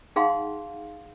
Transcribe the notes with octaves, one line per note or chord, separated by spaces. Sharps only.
D#4 G#4 F5 F#5 C6